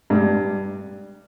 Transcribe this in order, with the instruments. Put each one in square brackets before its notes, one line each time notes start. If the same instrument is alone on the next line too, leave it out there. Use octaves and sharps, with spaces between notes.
[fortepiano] G2